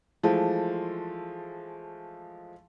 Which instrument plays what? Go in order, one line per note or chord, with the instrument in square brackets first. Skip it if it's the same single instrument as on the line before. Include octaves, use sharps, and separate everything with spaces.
[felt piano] E3 F3 G#3 A3